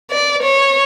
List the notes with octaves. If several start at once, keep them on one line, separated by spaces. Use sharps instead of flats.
D5
C#5